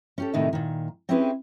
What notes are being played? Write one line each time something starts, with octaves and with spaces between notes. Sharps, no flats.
C#4 G4 A4
D2 A2 C3 D#3 D#4 E5
A#2 D#3
C4 C#4 E4 G4 G#4 B4